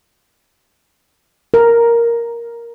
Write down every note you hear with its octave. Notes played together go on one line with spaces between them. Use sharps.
A#4